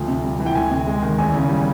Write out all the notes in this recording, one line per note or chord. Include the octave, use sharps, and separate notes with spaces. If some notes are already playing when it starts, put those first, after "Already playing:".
Already playing: D2 F3
C3
G3
E3
G5
D2 G#5
C3
G#3
D#3
E2 G#5
C#3
G3